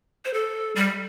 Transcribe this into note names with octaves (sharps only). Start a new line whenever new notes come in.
C5
A4
G3